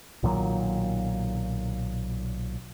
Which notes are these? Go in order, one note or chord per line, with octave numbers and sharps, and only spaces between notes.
B1 A#2 D#3 F#3